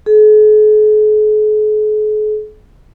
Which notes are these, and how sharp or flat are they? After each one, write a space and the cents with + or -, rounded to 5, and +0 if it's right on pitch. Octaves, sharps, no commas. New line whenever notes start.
G#4 +45